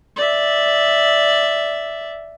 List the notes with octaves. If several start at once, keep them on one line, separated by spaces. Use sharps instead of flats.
D5 E5